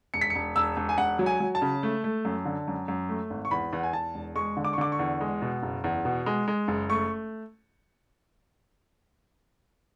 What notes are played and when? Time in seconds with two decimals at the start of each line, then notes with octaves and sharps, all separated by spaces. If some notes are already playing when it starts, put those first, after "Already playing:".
0.14 E1 C#7
0.21 B6
0.30 C#7
0.35 E1
0.56 E1 E6
0.77 E1
0.89 G#5
0.98 E1 F#5
1.19 F#3
1.26 G#5
1.40 F#3
1.55 A5
1.62 C#3
1.83 A3
2.04 A3
2.25 F#2
2.45 D3
2.68 F#2
2.88 F#2
3.09 A3
3.30 G#1
3.45 C#6
3.51 E2 B5
3.73 E2 F#5
3.83 G#5
3.93 E2 A5
4.15 E1
4.35 G#3 C#6
4.57 D3
4.65 D6
4.73 C#6
4.78 D3 D6
4.92 C#6
4.99 E2
5.21 G#3
5.42 B2
5.63 F#1
5.84 E2
6.05 B2
6.26 G#3
6.48 G#3
6.68 F#1
6.90 A3 C#6